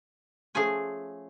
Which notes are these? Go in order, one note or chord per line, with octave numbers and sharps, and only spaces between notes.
F3 A3 C#4 G#4 G#5